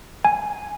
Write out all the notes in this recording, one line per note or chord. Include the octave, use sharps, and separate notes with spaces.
G#5